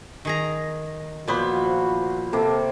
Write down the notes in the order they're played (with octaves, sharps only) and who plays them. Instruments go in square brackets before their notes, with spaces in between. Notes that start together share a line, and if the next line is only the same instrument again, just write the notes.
[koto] D#3 G#4 A#5
[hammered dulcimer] A#2 C5 B5 [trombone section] F3 F4 F#4 [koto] F#3 B3
[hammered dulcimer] C3 A#3 [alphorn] A4